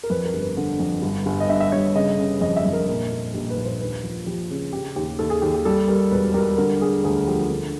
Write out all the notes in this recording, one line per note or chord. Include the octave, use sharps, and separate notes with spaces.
A#4
F2 B4
A#4
G1
B4
D3
F2
G1
G1
D#5
G2 E5
E5
G1 C#5
C#3 D#5
C#3
F2 D#5
E5
F2
A#4
A#2 A#4
A#2
A#1 G4
B4
A#1
C5
D#2 B4
F3
F3 G4
C#3
C#3 G4
D#2 G4
D#2 A4
G#4
D#2 G4
G4
G3 A4
G3 A#4
E1 B4
G3 A#4
D3 A#4
D3 G#4
D2 G#4
F3 G4
D3